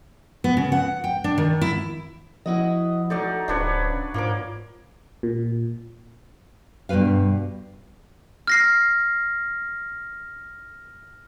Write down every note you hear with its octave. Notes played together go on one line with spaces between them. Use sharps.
B3
C#3
F#5
G5
D4
D#3
E4
F3 E4 F#4 D#5
F#3 A3 D#4 D5
D1 F2 G#2 C#3 D4 B4 C#5
E2 G#2 F3 A#3 D6
A#2
G2 B2 G3 B4 F5
F6 A#6 C7